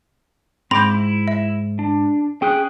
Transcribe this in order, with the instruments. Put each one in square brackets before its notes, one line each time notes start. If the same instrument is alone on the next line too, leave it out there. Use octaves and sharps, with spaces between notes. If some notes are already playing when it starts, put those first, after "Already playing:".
[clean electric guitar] G#2 [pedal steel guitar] C4 D6 G6 [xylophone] B5 C6 A#6
[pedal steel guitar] E4
[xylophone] E5
[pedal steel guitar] D4
[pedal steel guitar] C#4 D#6 F#6 [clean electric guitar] G#4 G5